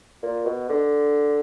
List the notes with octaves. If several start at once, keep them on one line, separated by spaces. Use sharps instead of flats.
A#2
B2
D3